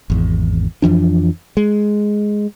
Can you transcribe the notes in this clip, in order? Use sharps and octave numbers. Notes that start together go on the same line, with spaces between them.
G#1 E2
F2 E3 F3 D4
G#3